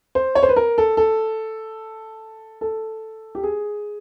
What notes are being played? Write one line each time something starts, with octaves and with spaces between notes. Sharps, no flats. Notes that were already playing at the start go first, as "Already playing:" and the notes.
C5
C#5
C5
B4
A#4
A4
A4
A4
G4
G#4